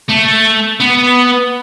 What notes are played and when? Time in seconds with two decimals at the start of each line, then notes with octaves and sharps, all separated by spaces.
0.09 A3
0.80 B3